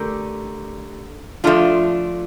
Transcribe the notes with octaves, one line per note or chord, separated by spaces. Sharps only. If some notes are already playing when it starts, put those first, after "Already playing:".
Already playing: D3 A3 G4 A#4
F3 A3 D4 F4